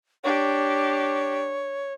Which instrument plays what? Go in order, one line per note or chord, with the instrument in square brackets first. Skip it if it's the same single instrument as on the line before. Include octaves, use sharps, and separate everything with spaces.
[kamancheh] D4 G4 [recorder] C#5